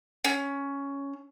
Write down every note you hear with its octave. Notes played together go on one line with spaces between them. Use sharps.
C#4